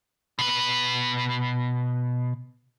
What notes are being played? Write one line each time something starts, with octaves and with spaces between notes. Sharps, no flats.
B2 B4